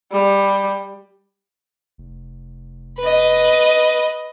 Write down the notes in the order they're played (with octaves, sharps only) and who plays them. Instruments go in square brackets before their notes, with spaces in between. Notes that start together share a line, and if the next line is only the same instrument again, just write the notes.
[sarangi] G3
[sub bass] F1
[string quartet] B4 D#5